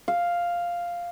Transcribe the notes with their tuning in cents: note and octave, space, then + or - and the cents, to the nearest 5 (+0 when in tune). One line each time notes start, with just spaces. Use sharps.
F5 +0